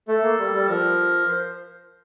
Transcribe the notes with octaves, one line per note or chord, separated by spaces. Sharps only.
A3 A4
A#3
G3
G3
F3 A#4
C5